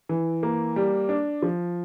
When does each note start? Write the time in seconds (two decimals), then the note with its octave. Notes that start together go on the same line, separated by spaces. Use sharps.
0.09 E3
0.43 A#3
0.76 G3
1.09 D4
1.42 F3